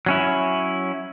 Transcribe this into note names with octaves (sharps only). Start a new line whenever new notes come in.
F#3 C#4 E4